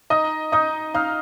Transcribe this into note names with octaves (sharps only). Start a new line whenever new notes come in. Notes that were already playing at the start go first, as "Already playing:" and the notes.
D#4 D#5 D#6
D#4 D#5 D#6
D#4 F5 F6